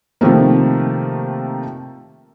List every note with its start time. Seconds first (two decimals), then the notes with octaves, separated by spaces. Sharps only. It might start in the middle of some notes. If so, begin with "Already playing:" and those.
0.21 C3 D#3 F3 A3 A#3